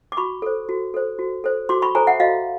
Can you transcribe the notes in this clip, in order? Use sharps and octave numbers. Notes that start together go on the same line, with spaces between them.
D6
F#4 B5 C#6
A4 C5
F#4
A4 C5
F#4
A4 C5
F#4 C6 D6
B5 C#6
A4 C5 G#5 A#5
E5 F#5
F#4 D#5 F5